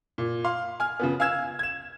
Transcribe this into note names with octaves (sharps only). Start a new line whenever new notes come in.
A#2
F5 C6
G#5 F6
C#3 F3 B3
F5 G#5 E6 G#6 E7
G#6 E7